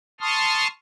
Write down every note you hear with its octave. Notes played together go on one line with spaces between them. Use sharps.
A5 C6 C#6 D#6 F6